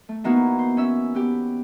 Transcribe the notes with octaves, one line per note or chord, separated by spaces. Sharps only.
A3
E3 A#3 B3 D#4 E4 F#4
C5
C#4 E5 E6
B3 G4